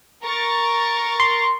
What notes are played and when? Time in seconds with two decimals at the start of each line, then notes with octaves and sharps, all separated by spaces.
0.24 A#4 C#6 A6
1.20 C6